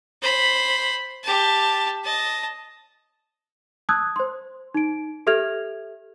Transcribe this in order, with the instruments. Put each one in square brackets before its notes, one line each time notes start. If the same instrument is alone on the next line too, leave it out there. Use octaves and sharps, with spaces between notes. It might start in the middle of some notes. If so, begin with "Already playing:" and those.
[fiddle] C5 B5
G4 A5
D#5 A5
[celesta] A5 D#6 E6 F#6 G#6
C5 C6
D#4 D7
G4 A4 E5 F6 G#6 F7